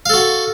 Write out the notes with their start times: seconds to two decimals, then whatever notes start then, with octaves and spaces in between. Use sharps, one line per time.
0.06 F5
0.09 A4
0.13 F#4